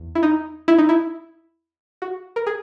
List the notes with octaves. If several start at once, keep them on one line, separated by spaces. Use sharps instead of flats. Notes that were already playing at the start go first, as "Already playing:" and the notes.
Already playing: E2
E4
D#4
E4
D#4
E4
F#4
A#4
G#4